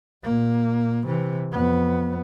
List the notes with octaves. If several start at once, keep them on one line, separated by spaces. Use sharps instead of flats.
A#2 A#3
C3 E3
F2 B3